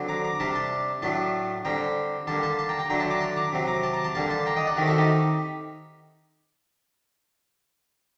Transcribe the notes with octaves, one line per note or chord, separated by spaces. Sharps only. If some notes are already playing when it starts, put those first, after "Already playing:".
Already playing: D3 F#3 C4
A#5 D6
A#5 D6
A#5
C3 G3 D4 A5 C6
A5 C6
A2 F#3 A3 D4 A5 C6
D3 G3 C4 G5 A#5
D3 G3 A#3 A5 C6
A5 C6
A5 C6
G5 A#5
G5 A#5
D3 F#3 A3 D4 G5 A#5
A5 C6
A#5 D6
A5 C6
A#5 D6
C3 F#3 C4
A#5 D6
A5 C6
A#5 D6
A5 C6
D3 G3 A#3 A5 C6
A5 C6
G5 A#5
D#5 G5
D5 F#5
D#3 A3 C4 G4 A#4
F#4 A4
D#4 G4